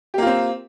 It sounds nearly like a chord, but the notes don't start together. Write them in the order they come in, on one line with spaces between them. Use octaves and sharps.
G4 A#3 F4 C4